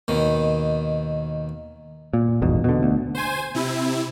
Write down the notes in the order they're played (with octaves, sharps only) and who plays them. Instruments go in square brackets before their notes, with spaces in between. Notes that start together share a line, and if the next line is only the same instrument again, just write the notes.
[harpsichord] D#2 B2 D#3
[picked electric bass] A#2
D#1 G#1 E2 B2
B2 D3
D2
[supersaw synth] C5 G#5
C3 E4